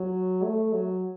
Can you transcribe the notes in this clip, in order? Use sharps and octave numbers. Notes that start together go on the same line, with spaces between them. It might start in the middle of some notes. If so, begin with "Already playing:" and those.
Already playing: F#3
A3
F#3